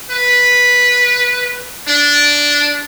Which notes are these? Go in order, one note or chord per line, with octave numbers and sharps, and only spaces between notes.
B4
D4